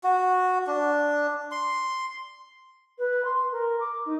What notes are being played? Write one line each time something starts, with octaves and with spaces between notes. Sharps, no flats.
F#4
D4
C6
B4
C6
A#4
D6
D#4